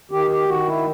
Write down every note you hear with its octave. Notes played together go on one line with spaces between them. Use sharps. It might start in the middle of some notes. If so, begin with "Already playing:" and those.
D#3 G4
G4
D#3 F#4
E4